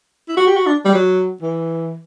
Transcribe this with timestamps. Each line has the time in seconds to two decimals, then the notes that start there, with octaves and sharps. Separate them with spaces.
0.28 E4
0.37 F#4
0.47 G4
0.56 F#4
0.66 D4
0.85 G3
0.94 F#3
1.42 E3